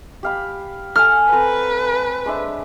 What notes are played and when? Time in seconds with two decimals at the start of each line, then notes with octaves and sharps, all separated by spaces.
0.23 G4 F5 B5
0.96 A4 F5 G#5 F6
1.32 C4 A4 B4 A#5
2.26 G#3 D4 E5